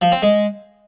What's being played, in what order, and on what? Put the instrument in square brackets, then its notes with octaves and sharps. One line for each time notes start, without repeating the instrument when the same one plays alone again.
[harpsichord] F3
C4
G#3